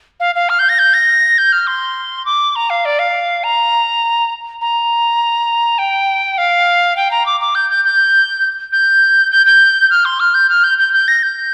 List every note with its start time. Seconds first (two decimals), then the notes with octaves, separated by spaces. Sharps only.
0.20 F5
0.35 F5
0.49 F6
0.59 G6
0.69 A#6
0.79 G6
0.94 A#6
1.38 G6
1.52 F6
1.67 C6
2.25 D6
2.56 A#5
2.70 F5
2.85 D5
2.99 F5
3.44 A#5
4.61 A#5
5.78 G5
6.38 F5
6.96 G5
7.11 A#5
7.26 D6
7.40 D6
7.55 G6
7.70 G6
7.85 G6
8.72 G6
9.32 G6
9.46 G6
9.90 F6
10.05 C6
10.20 F6
10.34 G6
10.49 F6
10.64 G6
10.78 G6
10.93 G6
11.08 A#6
11.23 G6